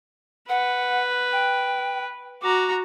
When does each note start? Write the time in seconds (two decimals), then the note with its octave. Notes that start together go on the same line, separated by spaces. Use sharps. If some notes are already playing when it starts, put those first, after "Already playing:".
0.49 B4 F#5
1.32 G5
2.42 F#4 A#5 D6